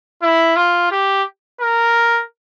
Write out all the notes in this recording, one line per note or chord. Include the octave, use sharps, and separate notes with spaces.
E4
F4
G4
A#4